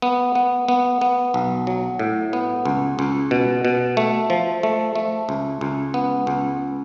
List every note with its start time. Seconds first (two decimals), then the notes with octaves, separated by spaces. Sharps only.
0.02 B3
0.35 B3
0.68 B3
1.01 B3
1.34 B1
1.67 F#3
1.99 A2
2.33 B3
2.65 C#2
2.99 C#2
3.31 B2
3.65 B2
3.97 A3
4.30 F3
4.63 A3
4.95 A3
5.29 C#2
5.61 C#2
5.94 B3
6.27 C#2